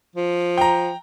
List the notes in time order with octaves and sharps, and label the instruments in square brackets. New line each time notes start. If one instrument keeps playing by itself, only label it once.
[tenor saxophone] F3
[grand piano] G5 A#5